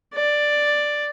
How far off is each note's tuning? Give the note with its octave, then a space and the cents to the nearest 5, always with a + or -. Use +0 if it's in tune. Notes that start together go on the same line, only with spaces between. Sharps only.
D5 +5